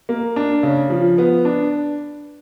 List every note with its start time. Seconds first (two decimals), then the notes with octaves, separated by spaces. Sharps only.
0.09 A#3
0.36 D4
0.63 C#3
0.90 F3
1.18 B3
1.45 D4